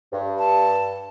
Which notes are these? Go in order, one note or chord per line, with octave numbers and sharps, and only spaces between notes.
G2
A5